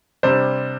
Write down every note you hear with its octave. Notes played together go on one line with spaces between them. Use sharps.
C3 G3 D4 C5